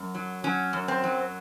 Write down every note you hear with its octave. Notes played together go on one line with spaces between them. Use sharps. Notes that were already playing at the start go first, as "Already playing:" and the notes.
Already playing: F#2
F#3
F#3 C#4
F#2
C4
F#3